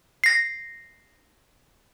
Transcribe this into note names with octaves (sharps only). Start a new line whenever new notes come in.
A#6 C7